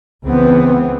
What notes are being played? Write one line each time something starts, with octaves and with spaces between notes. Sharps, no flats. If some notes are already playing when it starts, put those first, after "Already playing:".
C#2 E3 B3 C4